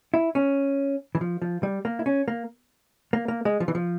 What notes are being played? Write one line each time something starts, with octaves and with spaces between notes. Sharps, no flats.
E4
C#4
E3
F3
F3
G3
A#3
E4
C#4
A#3
A#3
A#3
G#3
F3
E3
F3